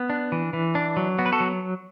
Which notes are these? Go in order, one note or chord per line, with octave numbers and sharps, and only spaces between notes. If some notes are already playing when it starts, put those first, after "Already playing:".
Already playing: B3
D4
E3
E3
D4
F#3
B3 F#4
B4
F#4 A4
F#3